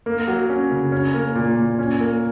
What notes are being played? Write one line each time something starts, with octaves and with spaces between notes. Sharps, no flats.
A#3
F#3
C#4
C#3
C#4
A#3
A#2
A#2
C#4
A#3